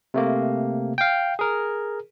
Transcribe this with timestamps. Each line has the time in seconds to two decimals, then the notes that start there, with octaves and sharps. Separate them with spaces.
0.14 C3 A3 A#3
0.98 F5 G5
1.39 G#4 A#4